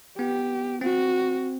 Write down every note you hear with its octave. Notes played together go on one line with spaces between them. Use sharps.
B3 G4
C4 F#4